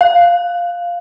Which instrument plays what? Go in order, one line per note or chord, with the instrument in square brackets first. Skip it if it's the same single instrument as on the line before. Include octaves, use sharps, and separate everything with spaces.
[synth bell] F5